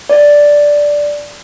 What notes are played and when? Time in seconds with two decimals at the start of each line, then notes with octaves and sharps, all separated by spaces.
0.09 D5